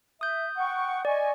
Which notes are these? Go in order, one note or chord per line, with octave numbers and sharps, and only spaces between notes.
E5 D#6 G6
F#5 G5 C#6
D5 D#5 G#5 C#6